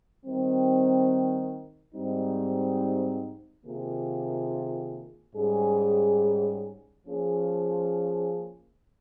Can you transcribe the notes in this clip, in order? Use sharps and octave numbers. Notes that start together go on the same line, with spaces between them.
D#3 G3 C4
G#2 G3 C4 D#4
C3 D#3 A#3 F4 G#4
G#2 G3 C#4 G#4
F3 A#3 C#4 G#4